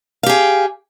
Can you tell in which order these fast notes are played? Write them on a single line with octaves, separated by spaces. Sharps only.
F5 G4 G#4